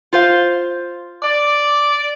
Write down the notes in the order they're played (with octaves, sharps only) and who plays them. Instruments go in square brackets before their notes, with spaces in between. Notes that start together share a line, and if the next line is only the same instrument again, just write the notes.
[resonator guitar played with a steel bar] F4 C5 F5
[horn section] D5